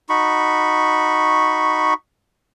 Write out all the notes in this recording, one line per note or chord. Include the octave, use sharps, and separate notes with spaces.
D#4 F#4 B5 C#6